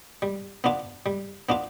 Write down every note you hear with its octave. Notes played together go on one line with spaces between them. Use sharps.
G3
B3 D4 F4
G3
B3 D4 F4